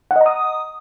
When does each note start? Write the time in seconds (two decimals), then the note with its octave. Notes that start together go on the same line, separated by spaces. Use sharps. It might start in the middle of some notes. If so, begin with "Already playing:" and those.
0.11 F#5
0.16 D#5
0.21 A#5
0.26 D#6